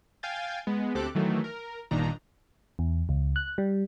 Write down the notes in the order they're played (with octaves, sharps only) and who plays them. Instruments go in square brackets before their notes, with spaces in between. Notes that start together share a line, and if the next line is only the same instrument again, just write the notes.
[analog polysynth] F5 G5 G#5 G6 A6
G#3 B3
D2 C4 G4 A4 D6 F#6
D#3 E3 F#3 A3
A#4
G1 A#2 D#3 D4 D#4 A#5
[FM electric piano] E2
C#2
F#6
G3